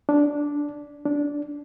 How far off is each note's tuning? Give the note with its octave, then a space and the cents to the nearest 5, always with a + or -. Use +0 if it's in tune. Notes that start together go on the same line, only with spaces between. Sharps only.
D4 -10
D4 -15